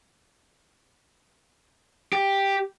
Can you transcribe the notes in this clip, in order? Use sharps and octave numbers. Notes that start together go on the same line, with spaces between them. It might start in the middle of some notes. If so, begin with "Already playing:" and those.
G4